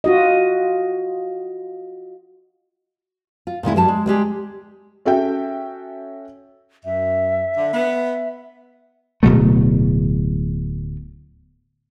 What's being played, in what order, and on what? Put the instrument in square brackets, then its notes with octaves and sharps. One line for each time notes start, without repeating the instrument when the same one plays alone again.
[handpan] F4 F#4 D#5
[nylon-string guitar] F4
A#2 D#3 G#3 E4
G2 F#3 G3 A5
G#3
G3 G#3 G4 G#4
[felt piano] C#4 F#4 A4 E5 G5
[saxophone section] F#2 [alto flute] E5
[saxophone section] D3
B3
[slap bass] D1 B2 F#3 A3